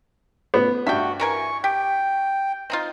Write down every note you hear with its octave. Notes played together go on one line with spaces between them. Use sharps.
B3
G2 F#4 E5 G5
E3 A#4 G#5 C#6
G4 G5
C4 D#4 F4